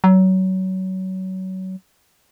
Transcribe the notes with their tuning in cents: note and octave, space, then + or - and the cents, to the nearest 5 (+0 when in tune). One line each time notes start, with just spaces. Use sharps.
F#3 +25